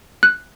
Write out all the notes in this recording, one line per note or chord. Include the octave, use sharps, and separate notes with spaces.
F#6